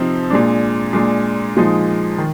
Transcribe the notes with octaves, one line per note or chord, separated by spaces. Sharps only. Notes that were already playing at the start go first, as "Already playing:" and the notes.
Already playing: C3 F3 C4 D#4
A#2 G#3 D4
A#2 G#3 D4
A#2 F3 G#3 D#4
D#3